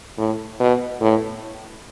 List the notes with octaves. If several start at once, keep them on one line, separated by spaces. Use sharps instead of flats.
A2
B2
A2